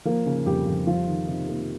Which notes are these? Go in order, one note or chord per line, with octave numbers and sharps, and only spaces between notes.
F3 A#3 A#4
C#3
F2 G3 G4
F2
F3 G3 F4
D#3
C3 D#4
A#3